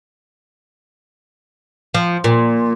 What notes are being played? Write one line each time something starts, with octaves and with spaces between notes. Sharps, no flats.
F3
A#2